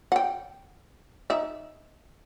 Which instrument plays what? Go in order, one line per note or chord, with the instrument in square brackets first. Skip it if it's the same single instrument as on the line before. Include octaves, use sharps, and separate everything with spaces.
[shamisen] F#5 G5
D#4 E5